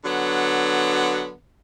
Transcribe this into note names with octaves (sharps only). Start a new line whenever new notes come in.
D3 F#3 B3